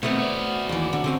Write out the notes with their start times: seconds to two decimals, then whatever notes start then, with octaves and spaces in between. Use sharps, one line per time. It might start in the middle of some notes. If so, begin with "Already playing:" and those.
0.03 B2 D#3 A3 B3 C4
0.18 F#4 D5
0.69 D#2 E3
0.93 D3
1.04 D3 C4 C#4